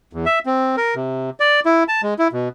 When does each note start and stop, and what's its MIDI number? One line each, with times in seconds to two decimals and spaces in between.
0.13 0.25 40
0.26 0.39 76
0.46 0.76 60
0.77 0.95 70
0.95 1.30 48
1.40 1.60 74
1.65 1.84 64
1.88 2.01 81
2.03 2.14 56
2.19 2.28 64
2.32 2.49 47